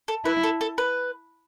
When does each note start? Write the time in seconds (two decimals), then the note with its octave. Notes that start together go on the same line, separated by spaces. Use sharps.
0.08 A4
0.25 E4 B4
0.43 A4
0.61 A4
0.78 B4